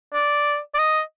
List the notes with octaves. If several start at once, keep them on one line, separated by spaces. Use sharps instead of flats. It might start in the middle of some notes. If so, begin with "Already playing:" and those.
D5
D5
D#5